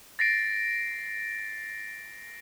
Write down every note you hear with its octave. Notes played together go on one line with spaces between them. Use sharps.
A6 A#6 C7 D7